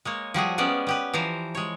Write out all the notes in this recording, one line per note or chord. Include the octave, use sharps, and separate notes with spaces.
G#3 A#3 C#5
F3 G3 F#4 G#4
G3 G#3 B3 C#4 D5
B3 G4 B4
E3 F3 C5 A#5
G#3 C#5